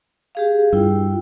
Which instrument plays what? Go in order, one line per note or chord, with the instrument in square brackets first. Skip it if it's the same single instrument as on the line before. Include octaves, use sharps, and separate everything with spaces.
[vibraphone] G4 G#4 F5
[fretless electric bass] G2 [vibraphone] E4 F4 G5